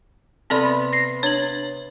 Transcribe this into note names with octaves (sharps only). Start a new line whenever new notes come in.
C3 B3 C4 A4 B4 D5
A#6 C7
D4 C#5 F#7